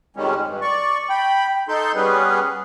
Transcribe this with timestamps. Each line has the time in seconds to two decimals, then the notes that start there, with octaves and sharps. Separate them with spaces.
0.16 F2 D#3 G3 G#3 C#4
0.46 G2
0.61 D5 C#6
1.10 G5 B5
1.69 D#4 A4 C6 G6
1.95 G3 B3 C#4 G#4 B4